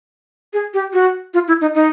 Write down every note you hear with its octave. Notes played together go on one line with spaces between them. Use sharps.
G#4
G4
F#4
F4
E4
D#4
D#4